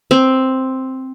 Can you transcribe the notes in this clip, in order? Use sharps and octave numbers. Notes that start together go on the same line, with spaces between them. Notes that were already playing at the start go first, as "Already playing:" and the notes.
C4